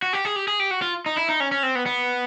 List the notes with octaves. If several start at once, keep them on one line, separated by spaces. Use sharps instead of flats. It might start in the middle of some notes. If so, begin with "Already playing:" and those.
F#4
G4
G#4
G4
G#4
G4
F#4
F4
D#4
E4
D#4
C#4
C#4
C4
B3
B3